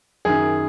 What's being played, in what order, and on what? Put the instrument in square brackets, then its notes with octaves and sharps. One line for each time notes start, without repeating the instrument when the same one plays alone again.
[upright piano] F#2 D#3 G#4